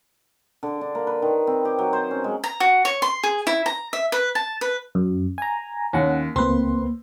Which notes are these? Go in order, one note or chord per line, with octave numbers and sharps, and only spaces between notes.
D3
D4
A#3
B4
D#3
C4
G4
F#3
C5
C#4
G#3
A#5
F#4
C#5
C6
G#4
E4
A#5
E5
B4
A5
B4
F#2
G#5 A#5
D#2 C#4 F#5
C#2 A#3 C4 B4 C6